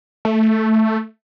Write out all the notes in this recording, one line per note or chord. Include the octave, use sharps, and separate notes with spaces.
A3